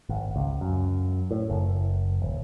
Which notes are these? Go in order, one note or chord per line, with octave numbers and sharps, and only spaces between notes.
G#1
C#2
F#2
A2
F#1
D#1